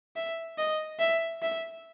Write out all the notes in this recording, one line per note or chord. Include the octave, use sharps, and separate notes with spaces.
E5
D#5
E5
E5